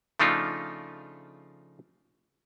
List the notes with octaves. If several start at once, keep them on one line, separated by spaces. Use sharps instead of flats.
C#3 F3 A3 D4 D#4 F4